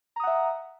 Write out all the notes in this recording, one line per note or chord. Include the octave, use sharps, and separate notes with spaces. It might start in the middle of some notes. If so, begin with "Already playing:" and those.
E5 F#5 A#5 D#6